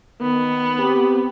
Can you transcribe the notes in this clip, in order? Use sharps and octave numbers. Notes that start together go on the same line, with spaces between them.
D#3 B3
C4 G4